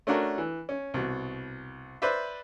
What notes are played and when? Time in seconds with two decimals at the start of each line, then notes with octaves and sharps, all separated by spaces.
0.07 A3 C#4 D4 F#4 A#4
0.38 E3
0.69 C#4
0.94 C2 B2
2.02 B4 C5 D5 E5